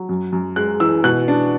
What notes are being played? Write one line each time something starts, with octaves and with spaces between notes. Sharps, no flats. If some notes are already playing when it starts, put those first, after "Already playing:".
Already playing: F#3
F#2
F#2
G#3 F#6
E3 E6
B2 F#6
D4